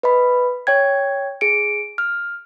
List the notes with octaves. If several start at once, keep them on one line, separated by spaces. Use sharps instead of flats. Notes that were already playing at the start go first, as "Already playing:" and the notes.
B4 D#5 B5
C#5 G5 G#6
G#4 C#7 D7
F6